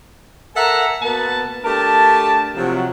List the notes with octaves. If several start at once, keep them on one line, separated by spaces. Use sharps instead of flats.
A4 A#4 E5 F#5 G#5 A#5
B2 A#3 B3 A5
A3 D4 G4 A#4 A5
C3 F3 F#3